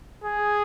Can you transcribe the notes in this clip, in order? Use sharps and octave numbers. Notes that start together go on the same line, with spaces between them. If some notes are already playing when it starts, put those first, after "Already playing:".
G#4